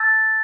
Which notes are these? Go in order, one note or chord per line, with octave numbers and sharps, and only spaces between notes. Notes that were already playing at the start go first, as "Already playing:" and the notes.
Already playing: A5 E6 G6 A6